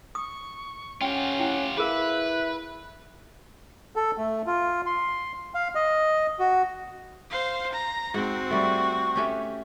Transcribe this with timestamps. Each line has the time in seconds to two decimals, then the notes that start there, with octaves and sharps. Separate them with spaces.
0.15 C#6 D#6
1.02 C#4 F4 G4 F#5 G5
1.39 E4 F#5 G5
1.77 E4 G#4 A#4 B4 F5 F#6
3.96 A4
4.18 A3
4.46 F4
4.86 C6
5.54 F5
5.75 D#5
6.39 F#4
7.30 C5 F5
7.73 A#5
8.14 G#2 C4 F#4
8.50 G3 A3 C#6
9.16 A3 C#4 G4